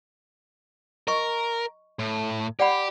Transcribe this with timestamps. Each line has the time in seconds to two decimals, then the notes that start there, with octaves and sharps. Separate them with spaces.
1.08 A#4 D#5 C#6
1.99 A2
2.59 G4 D5 F#5 B5